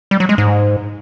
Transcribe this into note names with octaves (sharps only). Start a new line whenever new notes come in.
G3
F#3
G#3
G#2